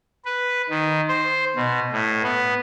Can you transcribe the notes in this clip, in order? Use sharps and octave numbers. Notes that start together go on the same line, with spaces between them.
B4
D#3
C5
B2
A2
B3